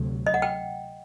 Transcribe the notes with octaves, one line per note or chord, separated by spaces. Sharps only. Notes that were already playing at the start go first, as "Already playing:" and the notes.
Already playing: D2 C3 F#3
D#5
F#5
G5